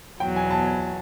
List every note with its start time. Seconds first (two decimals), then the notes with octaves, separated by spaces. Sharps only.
0.20 E2 B2 F#3 G5
0.36 G#5
0.50 A5
0.65 G#5